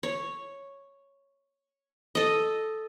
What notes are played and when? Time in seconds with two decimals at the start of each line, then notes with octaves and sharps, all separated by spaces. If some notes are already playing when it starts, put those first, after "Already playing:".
0.03 C#5
2.15 A4 D#5